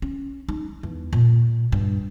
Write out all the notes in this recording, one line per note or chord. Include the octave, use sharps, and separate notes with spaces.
C#4
D#4
E2
A#2
G2